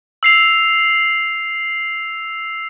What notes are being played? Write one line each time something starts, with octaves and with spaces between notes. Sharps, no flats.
E6 C7 F7